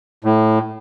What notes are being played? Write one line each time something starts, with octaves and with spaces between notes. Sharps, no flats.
A2